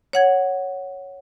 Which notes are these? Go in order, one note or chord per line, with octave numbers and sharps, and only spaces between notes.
C#5 F#5 G#6